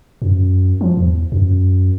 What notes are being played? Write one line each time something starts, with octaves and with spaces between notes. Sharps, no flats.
F#2
F3
E2
F#2